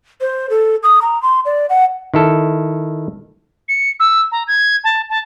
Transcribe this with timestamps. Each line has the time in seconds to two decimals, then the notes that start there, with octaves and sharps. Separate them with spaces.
0.21 C5
0.50 A4
0.83 D#6
1.02 A#5
1.22 C6
1.45 D5
1.69 F#5
2.14 D#3 E4 A4
3.68 C#7
3.99 E6
4.31 A#5
4.47 G#6
4.84 A5
5.09 A5